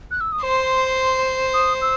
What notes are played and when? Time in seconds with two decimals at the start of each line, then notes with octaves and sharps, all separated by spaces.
0.11 F#6
0.21 E6
0.32 D#6
0.42 C5 C6
1.54 D#6
1.82 E6